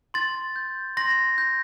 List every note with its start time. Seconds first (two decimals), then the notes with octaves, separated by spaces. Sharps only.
0.14 C6 A6
0.56 G6
0.97 C6 A#6
1.38 G6